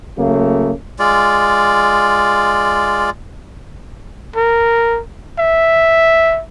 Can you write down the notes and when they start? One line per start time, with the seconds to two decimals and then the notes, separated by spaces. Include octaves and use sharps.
0.18 C#3 F#3 A3 A#3
0.99 G#3 F4 D5
4.36 A#4
5.39 E5